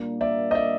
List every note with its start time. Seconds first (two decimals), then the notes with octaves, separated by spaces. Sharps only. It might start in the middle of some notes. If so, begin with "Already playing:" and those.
Already playing: A#2 G3 A#3 D4
0.21 D5 E5
0.51 D#5
0.55 D5 E5